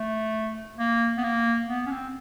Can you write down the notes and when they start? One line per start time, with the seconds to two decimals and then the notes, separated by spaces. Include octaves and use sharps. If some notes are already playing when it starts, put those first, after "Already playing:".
Already playing: A3
0.79 A#3
1.18 B3
1.24 A#3
1.69 B3
1.87 C#4
1.91 C4